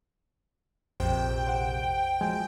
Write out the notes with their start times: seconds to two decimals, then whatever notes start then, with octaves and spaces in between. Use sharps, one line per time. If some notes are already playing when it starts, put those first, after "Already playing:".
1.00 A#1 F2 C3 C5 G5
1.47 C5 F#5
2.21 F3 F#3 G#3 G#5